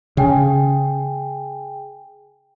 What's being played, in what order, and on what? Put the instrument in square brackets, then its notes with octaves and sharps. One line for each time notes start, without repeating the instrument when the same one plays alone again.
[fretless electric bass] C#3 [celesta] G#4 G5 G#5